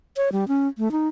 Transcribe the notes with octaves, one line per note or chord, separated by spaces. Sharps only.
C#5
G3
C#4
A3
D#4